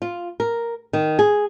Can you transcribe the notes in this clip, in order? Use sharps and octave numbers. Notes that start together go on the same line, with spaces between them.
F4
A#4
D#3
G#4